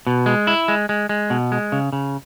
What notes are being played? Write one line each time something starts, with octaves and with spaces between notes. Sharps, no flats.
B2
G#3
E4
G#3
G#3
G#3
B2
G#3
C#3
C#3